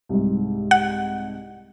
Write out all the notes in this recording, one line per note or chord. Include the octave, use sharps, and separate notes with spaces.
C2 G#2
F#5